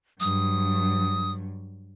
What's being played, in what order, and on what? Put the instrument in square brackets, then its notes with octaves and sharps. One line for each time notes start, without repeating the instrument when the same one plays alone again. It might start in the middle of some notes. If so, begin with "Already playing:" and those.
[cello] G2 F#3 [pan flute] D#6